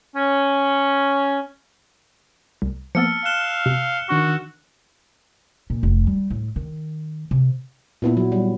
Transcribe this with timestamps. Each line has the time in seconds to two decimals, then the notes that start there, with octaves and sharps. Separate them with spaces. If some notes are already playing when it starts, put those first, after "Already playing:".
0.15 C#4
2.62 C2
2.95 F3 A#3 B3 A5 E6 F6 A6 C#7
3.25 F5 F#6 E7 G7
3.66 C3
4.09 D#3 D4 F#4 C#6
5.70 A#2
5.83 F1
6.07 G3
6.30 A2
6.56 D#3
7.31 C3
8.02 A#2 B3 E4
8.17 F#3
8.32 G3